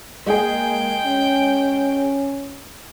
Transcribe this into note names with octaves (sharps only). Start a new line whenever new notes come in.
G#3 A#3 G#4 G5
C#4